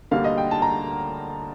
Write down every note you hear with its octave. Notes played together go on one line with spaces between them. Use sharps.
D2 D3 G3 A#3 F5
D#5
G5
A5
A#5